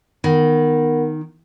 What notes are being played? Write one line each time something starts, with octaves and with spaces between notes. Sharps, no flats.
D#3 B3 A#4 F#5